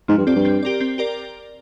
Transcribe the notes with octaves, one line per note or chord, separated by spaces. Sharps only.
G#2 F3
G2
F2 C4 G4 D5
G2
C4
G4 A#4 D5
C4
G4 A#4 D5